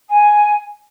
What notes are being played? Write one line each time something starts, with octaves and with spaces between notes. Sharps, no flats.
G#5